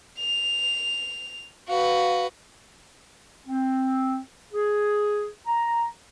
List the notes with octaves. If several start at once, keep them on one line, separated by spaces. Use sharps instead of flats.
F7
F#4 B4 F5
C4
G#4
A#5